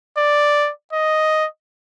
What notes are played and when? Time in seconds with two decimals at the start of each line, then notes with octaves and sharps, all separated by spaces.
0.17 D5
0.93 D#5